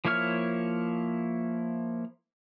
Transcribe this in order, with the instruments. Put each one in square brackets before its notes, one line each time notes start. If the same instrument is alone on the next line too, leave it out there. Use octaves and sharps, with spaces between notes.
[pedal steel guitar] F3 A#3 E4 C#5 F6